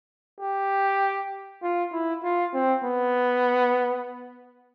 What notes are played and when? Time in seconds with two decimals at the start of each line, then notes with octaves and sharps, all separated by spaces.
0.40 G4
1.63 F4
1.92 E4
2.24 F4
2.54 C4
2.84 B3